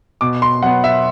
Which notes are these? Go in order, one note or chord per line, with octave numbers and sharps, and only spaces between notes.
B2 D6
C6
F#3 B3 F#5
E5